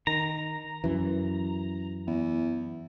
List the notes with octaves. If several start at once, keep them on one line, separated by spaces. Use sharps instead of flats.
D#3 A#5
F#2 E3
E2